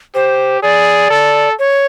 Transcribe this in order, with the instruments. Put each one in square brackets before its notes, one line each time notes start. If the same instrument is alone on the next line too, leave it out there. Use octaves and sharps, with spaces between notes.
[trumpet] G4 [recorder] C5
[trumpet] G#4 [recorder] D5
[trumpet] A4
[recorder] C#5